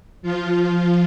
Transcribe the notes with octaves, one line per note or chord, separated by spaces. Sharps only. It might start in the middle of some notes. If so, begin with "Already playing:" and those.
F3 F4